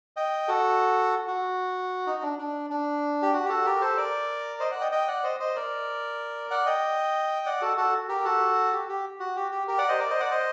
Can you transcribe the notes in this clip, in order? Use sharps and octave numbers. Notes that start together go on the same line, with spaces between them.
D#5 G5
F#4 A4
F#4
D#4
D4
D4
D4
G4
F#4
G4
F#4 A4
G4 A#4
A4 C5
A#4 D5
C5 D#5
D5 F#5
D#5 G5
D#5 G5
D5 F#5
C5 D#5
C5 D#5
A#4 D5
D5 F#5
D#5 G5
D5 F#5
F#4 A4
F#4 A4
G4 A#4
F#4 A4
G4
G4
F#4
G4
G4
G4 A#4
D5 F#5
C5 D#5
A#4 D5
C5 D#5
D5 F#5
C5 D#5